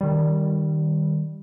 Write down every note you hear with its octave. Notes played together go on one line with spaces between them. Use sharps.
D#3 G3